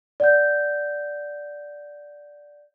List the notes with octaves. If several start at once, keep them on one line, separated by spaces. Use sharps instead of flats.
D5 F#5 G6